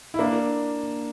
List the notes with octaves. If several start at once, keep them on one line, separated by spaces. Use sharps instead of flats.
E4
A#3 D4